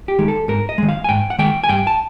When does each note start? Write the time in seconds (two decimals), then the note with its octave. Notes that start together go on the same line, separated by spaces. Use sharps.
0.08 G4
0.19 D#3 G#3
0.28 A4
0.48 G#2 A#4
0.69 D#5
0.78 D#3 G#3
0.89 F5
1.04 G#5
1.09 G#2 G5
1.30 F#5
1.39 D#3 G#3 G5
1.64 G#5
1.69 G2 G5
1.87 A5